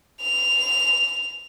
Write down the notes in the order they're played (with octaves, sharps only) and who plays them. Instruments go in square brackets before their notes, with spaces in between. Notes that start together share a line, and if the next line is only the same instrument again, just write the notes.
[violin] F7